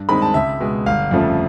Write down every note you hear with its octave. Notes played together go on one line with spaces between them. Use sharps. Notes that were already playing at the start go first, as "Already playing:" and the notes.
Already playing: G2
D#3 G#3 C4 B5
A5
C#2 E5
B2 G#3
G1 F5
F2 C#3 F3 A3